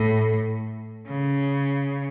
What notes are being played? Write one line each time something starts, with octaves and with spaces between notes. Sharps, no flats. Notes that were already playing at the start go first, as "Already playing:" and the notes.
Already playing: A2
C#3